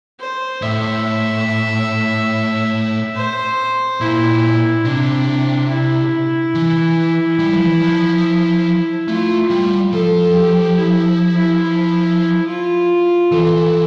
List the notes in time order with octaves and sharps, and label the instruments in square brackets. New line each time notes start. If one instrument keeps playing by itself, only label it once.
[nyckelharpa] C5
[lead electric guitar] A2 [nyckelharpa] E5
[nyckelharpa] C5
[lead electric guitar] A#2 [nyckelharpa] E4
[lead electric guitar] C3 [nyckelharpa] D4
[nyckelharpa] E4
[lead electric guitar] E3
G3
F3
E3
F3
[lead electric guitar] A3 [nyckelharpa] F4
[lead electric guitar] G3
[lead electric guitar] F3 [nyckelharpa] A4
[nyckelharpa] G4
E4
E4
E4
F4
[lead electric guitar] E3 [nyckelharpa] A4